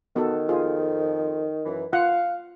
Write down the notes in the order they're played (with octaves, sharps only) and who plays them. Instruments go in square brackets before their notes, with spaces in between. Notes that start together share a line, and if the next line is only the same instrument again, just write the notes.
[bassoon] D#3 [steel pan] B3 F#4 A4
[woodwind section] F2 F3 [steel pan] F4 G#4
[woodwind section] F#2 E3
[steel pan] F4 F#5 [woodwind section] F5